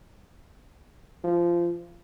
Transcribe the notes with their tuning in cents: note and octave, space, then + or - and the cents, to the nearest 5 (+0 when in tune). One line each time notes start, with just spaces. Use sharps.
F3 -20